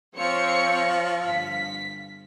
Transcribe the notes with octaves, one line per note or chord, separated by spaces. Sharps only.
F3 C4 C#5 C#7
G1 B6